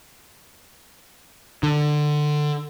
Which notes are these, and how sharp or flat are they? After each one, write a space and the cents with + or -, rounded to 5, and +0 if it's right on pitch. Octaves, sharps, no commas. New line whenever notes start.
D3 +20